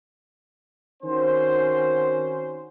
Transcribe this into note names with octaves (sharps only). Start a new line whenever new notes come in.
D#3 C4 C#4 F#4 C5